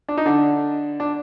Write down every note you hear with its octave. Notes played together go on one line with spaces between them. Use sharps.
D4
D#4
D3 D4
D4